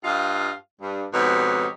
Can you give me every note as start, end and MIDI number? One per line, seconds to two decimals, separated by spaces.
0.04 0.51 43
0.04 0.51 65
0.04 0.51 75
0.04 0.51 77
0.81 1.05 43
1.13 1.67 41
1.13 1.67 44
1.13 1.67 47
1.13 1.67 63
1.13 1.67 67
1.13 1.67 73